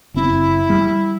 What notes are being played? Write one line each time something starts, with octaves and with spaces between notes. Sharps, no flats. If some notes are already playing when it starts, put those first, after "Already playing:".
F#1 C4 E4
G3